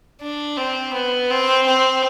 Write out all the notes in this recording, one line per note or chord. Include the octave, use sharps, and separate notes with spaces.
D4
C4
B3
C4
C4